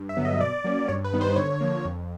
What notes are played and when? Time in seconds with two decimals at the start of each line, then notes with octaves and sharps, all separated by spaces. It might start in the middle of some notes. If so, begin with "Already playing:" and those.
Already playing: G2
0.09 E5
0.17 D3 F#3 B3
0.25 D#5
0.40 B2 D5
0.64 F#3 A#3 C#4
0.88 G2 C#5
1.04 B4
1.13 D#3 G3 B3 D#4
1.21 C5
1.36 D3 C#5
1.61 F3 A#3
1.85 F2